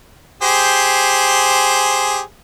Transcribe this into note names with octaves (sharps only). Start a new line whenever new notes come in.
G4 G#4 C5